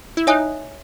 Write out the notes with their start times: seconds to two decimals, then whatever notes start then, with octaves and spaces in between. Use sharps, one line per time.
0.17 E4
0.27 D#4 C#5 E5 G#5 D#6 F#6